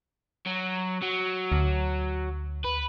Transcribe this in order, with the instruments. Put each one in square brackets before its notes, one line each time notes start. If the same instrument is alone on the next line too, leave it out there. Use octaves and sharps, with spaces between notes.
[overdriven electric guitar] F#3
F#3
[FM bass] D2
[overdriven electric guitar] B4